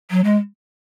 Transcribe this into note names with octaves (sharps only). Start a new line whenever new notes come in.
F#3
G#3